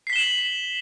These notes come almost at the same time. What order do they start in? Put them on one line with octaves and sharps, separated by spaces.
C7 B6 G7 E7 F#7